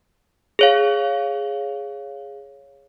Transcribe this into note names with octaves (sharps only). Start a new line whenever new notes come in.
G#4 C#5 F5